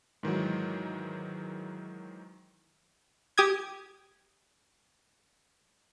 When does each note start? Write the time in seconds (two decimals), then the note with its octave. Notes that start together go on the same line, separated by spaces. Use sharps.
0.23 G#2 D#3 E3 F#3
3.38 G4 D#6 G#6